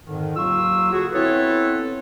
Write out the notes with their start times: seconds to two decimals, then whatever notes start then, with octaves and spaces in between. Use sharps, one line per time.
0.06 F2 G#2 D3 D#3
0.37 D#2 F#3 F4 C#6 E6
0.92 D3 F#4 G#4
1.12 B3 C4 E4 A4 B4 C#5